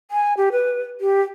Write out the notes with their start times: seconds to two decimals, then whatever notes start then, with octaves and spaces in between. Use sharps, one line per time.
0.11 G#5
0.37 G4
0.52 B4
1.01 G4